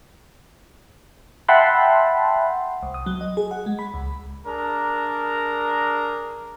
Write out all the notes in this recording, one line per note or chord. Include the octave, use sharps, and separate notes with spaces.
E5 F#5 G5 A5 B5 C6
C2
D#6
F#3
D#5
G#4
F#5
G#3
B5
C#2
D4 G#4 A#4 A#5